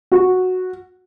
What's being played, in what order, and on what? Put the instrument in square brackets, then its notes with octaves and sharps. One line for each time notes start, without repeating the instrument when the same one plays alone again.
[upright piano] F#4